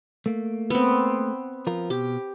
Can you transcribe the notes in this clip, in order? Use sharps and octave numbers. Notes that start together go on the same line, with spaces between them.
A3 A#3
B3 C4
F3 F4 A#4
B2 G4